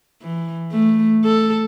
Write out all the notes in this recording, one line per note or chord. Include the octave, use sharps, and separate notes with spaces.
E3
A3
A4